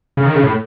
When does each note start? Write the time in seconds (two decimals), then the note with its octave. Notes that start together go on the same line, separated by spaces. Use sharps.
0.17 C#3
0.26 D#3
0.35 C#3
0.43 A2